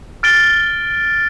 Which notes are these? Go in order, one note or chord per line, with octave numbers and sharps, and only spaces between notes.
F6 A6 D7 G7